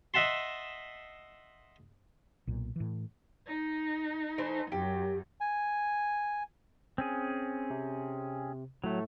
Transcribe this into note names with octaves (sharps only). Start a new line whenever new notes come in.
D#5 E5 F#5 A5 C6
B1 A#2
A2 E3
D#4
E3 A3 C5
F#2 G4
G#5
C4 C#4 G#4
C3
A2 F#3 A3